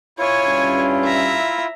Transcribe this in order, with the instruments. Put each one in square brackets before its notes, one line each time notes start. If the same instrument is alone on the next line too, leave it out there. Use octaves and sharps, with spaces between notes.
[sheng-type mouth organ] E4 F4 [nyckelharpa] C#5 G#5
[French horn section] G2 C#4
[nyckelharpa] E5 A#5